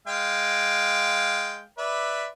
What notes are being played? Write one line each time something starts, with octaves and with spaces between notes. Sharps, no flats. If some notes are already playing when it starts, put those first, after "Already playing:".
G#3 F5 G5
B4 D5 E5